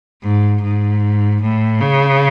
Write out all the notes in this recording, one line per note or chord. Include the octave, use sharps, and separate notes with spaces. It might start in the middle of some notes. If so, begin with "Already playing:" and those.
G#2
G#2
A2
C#3